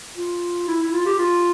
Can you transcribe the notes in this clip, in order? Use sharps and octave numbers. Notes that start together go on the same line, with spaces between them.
F4
E4
E4
F4
G4
F4